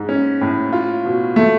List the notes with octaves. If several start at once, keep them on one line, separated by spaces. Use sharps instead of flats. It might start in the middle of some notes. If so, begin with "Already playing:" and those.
Already playing: G#2
C#4
A2
F4
B2
A3